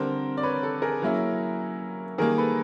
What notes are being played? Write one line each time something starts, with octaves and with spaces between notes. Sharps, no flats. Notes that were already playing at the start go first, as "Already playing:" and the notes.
Already playing: D3 G3 C4 A#4 C5
D5
B4 C#5
A4
G#4 A#4
F#3 A#3 C#4 E4
D#3 G3 A#3 G#4 A#4
A4 B4